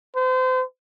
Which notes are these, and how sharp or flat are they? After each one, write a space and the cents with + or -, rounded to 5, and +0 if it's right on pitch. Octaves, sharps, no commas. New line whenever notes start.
C5 -35